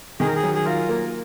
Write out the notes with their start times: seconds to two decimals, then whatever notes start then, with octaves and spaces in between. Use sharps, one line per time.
0.20 D#3 G#4
0.27 A#4
0.35 G#4
0.43 F#3
0.54 G#4
0.66 F4 A#4
0.89 A#3